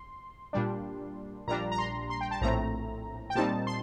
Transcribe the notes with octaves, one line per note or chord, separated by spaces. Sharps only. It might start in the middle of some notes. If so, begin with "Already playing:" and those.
Already playing: C6
A#2 G3 D4
A#1 A#2 G3 D4 A#5
A#5
C6
C6
G5
A5
A#1 A2 A3 C4 A#5
G5
A#2 G3 C4 D#4 A5
C6